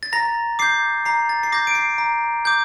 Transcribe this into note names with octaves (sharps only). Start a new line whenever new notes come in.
A6
A#5 A#6
D6 G6 C7
A#5 C7
A6
C7
D6 G6 A#6
D7
C7
A#5
D6 G6